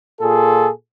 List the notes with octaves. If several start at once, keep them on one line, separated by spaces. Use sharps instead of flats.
A#2 F4 G#4 A4